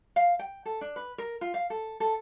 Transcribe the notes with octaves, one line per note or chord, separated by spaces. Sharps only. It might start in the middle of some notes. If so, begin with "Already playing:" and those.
F5
G5
A4
D4
B4
A#4
F4
F5
A4
A4